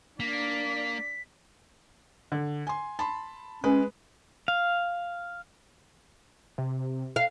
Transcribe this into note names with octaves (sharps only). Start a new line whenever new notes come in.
A#3 D4 D5 B6
D3
G#5 C6
A5 B5 C6
G#3 C#4 G#4 B4
F5
C3
F5